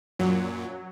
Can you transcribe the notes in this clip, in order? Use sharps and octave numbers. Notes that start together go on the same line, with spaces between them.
F#2 A#2 F#3